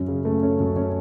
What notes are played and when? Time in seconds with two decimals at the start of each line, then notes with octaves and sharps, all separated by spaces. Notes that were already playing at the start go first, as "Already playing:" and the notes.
Already playing: F#2 C#4
0.08 C#3
0.25 A3
0.43 C#4
0.60 F#2
0.76 C#4